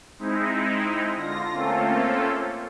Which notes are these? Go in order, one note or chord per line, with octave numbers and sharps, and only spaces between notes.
G#3 C4 D#4 E4
D3 F4 A#6
A3 A#3 C4 C#4 F4 A4